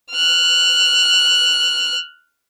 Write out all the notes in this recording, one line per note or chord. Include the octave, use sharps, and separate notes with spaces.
F6 F#6